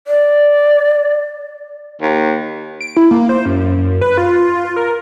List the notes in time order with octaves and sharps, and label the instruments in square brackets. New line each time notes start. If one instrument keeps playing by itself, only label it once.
[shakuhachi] D5
[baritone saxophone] D#2
[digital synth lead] D7
E4
A#3
C5
F#2
F#2
B4
F4
A#4